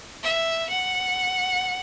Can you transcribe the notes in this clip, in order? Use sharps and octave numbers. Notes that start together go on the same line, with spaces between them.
E5
F#5